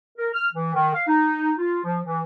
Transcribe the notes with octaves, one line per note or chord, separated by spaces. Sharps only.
A#4
F6
E3
D#3
F5
D#4
F4
F3
E3